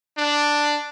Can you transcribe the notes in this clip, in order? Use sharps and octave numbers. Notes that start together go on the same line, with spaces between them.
D4